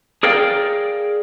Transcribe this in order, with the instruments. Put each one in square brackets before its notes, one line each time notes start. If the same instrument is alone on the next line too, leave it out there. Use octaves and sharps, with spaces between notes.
[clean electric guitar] G#4 A#4 D5 F5 G5